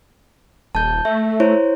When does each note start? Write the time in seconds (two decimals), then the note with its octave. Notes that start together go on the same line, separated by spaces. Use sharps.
0.75 D#1 A5 G6
1.05 A3 E5
1.40 E4 C5 C#5